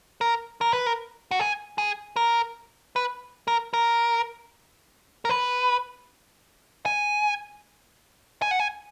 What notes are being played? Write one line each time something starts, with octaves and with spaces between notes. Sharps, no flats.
A#4
A#4
B4
A#4
F#4
G#4
G#4
A#4
B4
A#4
A#4
A#4
B4
G#5
G#5
F#5
G#5